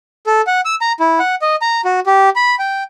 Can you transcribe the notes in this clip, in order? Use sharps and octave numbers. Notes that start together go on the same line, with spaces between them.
A4
F#5
E6
A#5
E4
F#5
D#5
A#5
F#4
G4
B5
G5